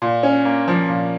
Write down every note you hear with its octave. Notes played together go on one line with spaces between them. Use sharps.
A#2
C#4
A#3
F3
A#2